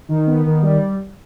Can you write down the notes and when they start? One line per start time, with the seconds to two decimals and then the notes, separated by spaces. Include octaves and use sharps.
0.09 D#3
0.27 B3
0.45 D#3
0.62 G3